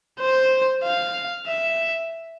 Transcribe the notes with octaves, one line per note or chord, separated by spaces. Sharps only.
C5
F5
E5